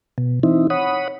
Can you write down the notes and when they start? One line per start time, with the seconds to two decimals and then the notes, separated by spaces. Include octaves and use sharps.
0.18 B2
0.43 E3 C4 D#4 E4
0.70 C#5 F#5 B5 D#6